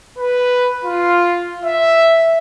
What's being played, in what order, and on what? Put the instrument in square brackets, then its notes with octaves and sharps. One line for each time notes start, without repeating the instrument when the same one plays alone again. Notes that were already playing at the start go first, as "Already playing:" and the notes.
[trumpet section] B4
F4
E5